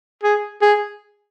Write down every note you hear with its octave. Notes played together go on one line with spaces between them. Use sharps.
G#4
G#4